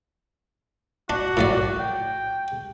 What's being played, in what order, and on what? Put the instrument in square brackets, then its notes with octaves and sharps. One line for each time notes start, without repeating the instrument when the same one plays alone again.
[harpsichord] D4 [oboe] F#4
[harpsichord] A2 F#3 D5
[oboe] G5